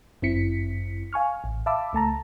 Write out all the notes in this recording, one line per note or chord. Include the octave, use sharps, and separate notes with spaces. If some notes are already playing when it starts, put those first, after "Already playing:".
G1 F#2 C4 E4 B6 C#7
F5 G#5 C#6 F6
A1
E5 F5 A5 B5 D6 E6
C#2 A3 A5 A#5